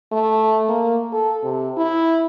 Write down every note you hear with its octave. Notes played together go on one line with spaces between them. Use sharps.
A3
A#3
A4
C3
E4